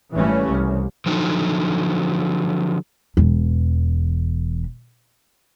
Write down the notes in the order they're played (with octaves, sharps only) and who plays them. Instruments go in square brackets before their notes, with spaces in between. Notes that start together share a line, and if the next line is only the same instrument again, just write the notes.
[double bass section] G#1 C#3 E3 G3 A3 C#4
C2
[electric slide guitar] D3 F3 F#3 D#4
[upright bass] E1 E2